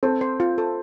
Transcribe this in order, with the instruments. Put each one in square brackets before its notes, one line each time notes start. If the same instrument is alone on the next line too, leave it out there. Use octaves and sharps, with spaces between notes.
[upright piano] C4 [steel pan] A4
[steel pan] C5
F4
A4